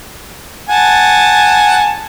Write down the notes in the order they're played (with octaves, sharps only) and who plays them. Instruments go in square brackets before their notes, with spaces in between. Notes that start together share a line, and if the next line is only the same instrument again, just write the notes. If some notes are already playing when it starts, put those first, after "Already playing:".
[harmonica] F#5 G#5 A5